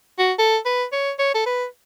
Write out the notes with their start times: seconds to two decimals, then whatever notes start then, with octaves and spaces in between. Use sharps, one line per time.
0.19 F#4
0.39 A4
0.66 B4
0.93 C#5
1.19 C#5
1.35 A4
1.46 B4